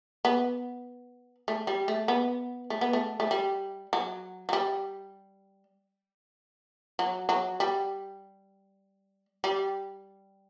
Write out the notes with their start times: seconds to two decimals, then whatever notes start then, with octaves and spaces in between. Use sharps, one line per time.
0.25 B3
1.48 A3
1.67 G3
1.88 A3
2.08 B3
2.70 A3
2.81 B3
2.93 A3
3.20 A3
3.31 G3
3.93 F#3
4.49 F#3
4.53 G3
6.99 F#3
7.29 F#3
7.60 G3
9.44 G3